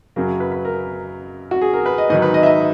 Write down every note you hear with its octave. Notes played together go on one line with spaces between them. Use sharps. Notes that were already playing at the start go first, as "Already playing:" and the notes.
F#2 C#3 F#3 A#4
B4
B4
A#4
F#4
G#4
A#4
B4
D#5
G#2 D#3 F#3 D#5
B4
D#5
E5
D#5